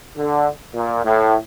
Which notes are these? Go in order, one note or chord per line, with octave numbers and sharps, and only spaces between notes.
D3
A#2
A2